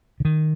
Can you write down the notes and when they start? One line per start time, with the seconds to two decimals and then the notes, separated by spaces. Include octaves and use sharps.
0.20 D3
0.25 D#3